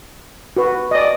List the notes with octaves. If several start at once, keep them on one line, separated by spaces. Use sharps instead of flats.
F#4 B4
D#5
D5